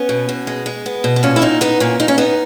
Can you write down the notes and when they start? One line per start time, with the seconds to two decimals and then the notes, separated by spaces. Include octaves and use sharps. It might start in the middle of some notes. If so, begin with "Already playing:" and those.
Already playing: B3 C#4
0.09 B2
0.29 B2
0.47 G#3
0.66 G#3
0.86 B3
1.04 B2
1.16 B3
1.23 A#2 C#4
1.36 E4
1.42 A#2 D#4
1.61 B3 D#4
1.80 A#2 C#4
2.00 A#2 D#4
2.08 C#4
2.18 B3 D#4